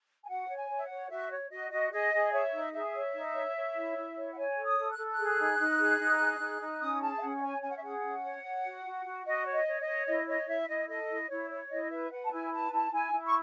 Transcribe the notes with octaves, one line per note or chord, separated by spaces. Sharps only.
G#5
F#4 F#5
C#5
G#5
C#5
E5
F#5
C#5
F#4 E5
C#5
F#4 D#5
F#4 D#5
G#4 D#5
G#4
C#5 E5
D#4
G#4 E5
C#5
D#4
C#5
C#5
E4
E4
C#5
F#5
C#5 G#5
A4
D#6
A4
F#6
A4
F#6
G#4
D#4
D#4
G#4
D#4
G#4
D#4
D#4
C#4 D#6
G#4 A5
E5
C#4 F#5
F#5
C#5 G#5
C#4 G#5
F#5
E5
G#4 F#5
C#4
C#5
C#5
F#4
F#4
F#4
F#4 D#5
C#5
D#5
C#5
D#5
C#5
E4 D#5
C#5 D#5
E4 E5
E4 D#5
A4 D#5
E4
E4 C#5
C#5
E4 D#5
B4 E5
B4 F#5
A5
E4 G#5
B4 A5
E4 A5
E4 G#5
E4
C#6